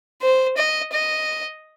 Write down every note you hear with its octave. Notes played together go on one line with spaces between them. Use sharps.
C5
D#5
D#5